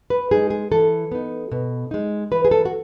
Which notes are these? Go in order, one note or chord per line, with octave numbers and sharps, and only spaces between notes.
B4
G#3 D#4 G#4
G#4
E3 A4
B3 D#4
B2
G#3 D#4
E3 B4
G#4
A4
F#4